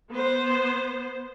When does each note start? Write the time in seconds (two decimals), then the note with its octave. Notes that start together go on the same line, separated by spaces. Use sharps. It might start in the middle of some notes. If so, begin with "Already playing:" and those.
0.11 B3 C5